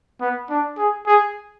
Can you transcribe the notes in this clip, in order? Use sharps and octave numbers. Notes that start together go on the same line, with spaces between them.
B3
D4
G#4
G#4